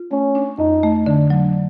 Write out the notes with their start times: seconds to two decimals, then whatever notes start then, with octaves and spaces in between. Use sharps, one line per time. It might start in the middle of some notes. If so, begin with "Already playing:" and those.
Already playing: F4
0.11 A3 C#4
0.35 D4
0.58 F2 D#4
0.83 A3
1.06 D3 D4
1.30 F#3